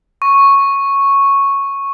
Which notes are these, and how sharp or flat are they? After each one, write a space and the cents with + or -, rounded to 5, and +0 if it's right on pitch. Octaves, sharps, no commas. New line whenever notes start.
C#6 -5